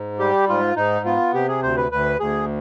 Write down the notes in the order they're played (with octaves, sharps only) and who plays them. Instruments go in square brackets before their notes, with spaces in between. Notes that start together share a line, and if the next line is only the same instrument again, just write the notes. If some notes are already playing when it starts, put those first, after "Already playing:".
Already playing: [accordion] G#2
G3 G4
G#2 F4
G#2 D#4
B3 F4
C3 G4
G#4
D2 C5
B4
D2 B4
D2 G#4